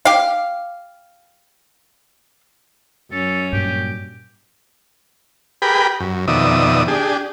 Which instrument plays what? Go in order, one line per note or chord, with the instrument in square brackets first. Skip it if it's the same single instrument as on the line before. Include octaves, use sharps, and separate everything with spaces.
[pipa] G4 F5
[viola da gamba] F#2 C#4 [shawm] A4
[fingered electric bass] G2 A#2 [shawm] G4
[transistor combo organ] G4 G#4 A#4 B4 G5 B5
F#2
F2 B2 D#3 D5 E5 D#6
D4 G4 G#4